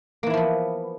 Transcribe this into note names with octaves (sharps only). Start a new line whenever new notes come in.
E3 F3 A#3 B3 E4